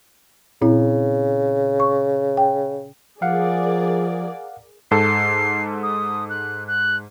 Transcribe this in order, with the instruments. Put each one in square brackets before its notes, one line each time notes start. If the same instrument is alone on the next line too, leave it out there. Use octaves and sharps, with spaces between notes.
[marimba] A#2 C4 E4 [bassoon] C#3
[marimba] C#6
G5
[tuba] F3 [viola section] G#4 A#4 D5 [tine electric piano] F5 F#5
[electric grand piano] G#2 A4 [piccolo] C7
[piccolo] D#6
F#6
F#6